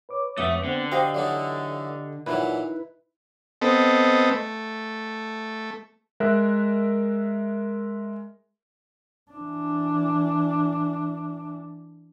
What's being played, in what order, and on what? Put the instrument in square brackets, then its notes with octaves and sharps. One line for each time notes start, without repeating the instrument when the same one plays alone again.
[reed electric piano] B4 C#5 D6
[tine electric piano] F2 F#4 D#6 [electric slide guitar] A3 E5
[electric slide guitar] D3 [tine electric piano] B3 C4 C5
[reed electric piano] F#4 C5 G5 [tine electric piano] G4 D#5 [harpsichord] F5
[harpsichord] E3 F#3 D#4 [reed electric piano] A4 D5
[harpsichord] A#2 E3 F#3 [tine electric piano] D#4 E4 B4
[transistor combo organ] B3 C4 A4 D#5
A3
[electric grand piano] G#3 A#4 E5 F#6
[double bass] E3 D4